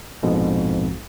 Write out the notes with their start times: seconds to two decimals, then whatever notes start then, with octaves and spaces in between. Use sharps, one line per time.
0.23 A#1 F2 G#2 B2